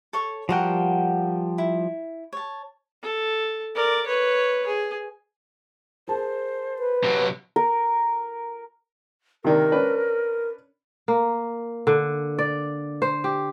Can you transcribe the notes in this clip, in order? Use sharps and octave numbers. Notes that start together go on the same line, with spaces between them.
A4 C#5 C#6
F3 G3 F#4 A#4 F#5 G5
E4
C#5 A5
A4
A#4 D5
B4 C#5
G#4
G#4 A#4 C5 A5
B4
C3 F#3
A#4
C3 D#3 D4 A#4
C#4 D4 B4
A#3
D3
D5
C5
G4